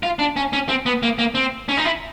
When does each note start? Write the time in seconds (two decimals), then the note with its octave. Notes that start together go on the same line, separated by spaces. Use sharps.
0.03 F4
0.19 D4
0.36 C#4
0.53 C#4
0.69 C4
0.86 B3
1.03 A#3
1.19 A#3
1.35 C4
1.69 C#4
1.77 D#4
1.85 E4